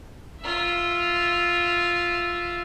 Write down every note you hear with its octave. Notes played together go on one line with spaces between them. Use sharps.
F4 E5